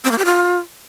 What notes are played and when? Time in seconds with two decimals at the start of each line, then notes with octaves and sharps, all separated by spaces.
0.04 C4
0.11 A#3
0.18 G4
0.25 F4